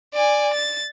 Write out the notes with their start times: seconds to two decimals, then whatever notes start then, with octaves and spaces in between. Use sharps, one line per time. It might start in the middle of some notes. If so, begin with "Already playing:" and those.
0.14 D5 G#5
0.53 A6